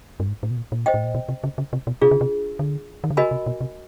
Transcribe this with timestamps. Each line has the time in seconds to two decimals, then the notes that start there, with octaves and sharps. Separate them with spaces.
0.20 G2
0.28 G#2
0.43 A2
0.50 B2
0.57 A#2
0.72 A#2
0.86 C5 D#5 G5
0.94 A2
1.04 A#2
1.15 B2
1.29 C3
1.44 C#3
1.58 C#3
1.73 C3
1.87 B2
2.01 C3 D4 F4 G#4
2.11 C#3
2.21 C3
2.59 D3
3.04 D#3
3.10 D3
3.17 C#3 F#4 A#4 D#5 G#5 B5
3.31 C3
3.46 B2
3.61 C3